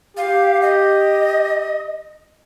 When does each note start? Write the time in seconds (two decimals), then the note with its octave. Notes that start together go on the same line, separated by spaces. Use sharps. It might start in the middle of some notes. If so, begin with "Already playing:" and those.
0.17 G4 F5
0.62 D#5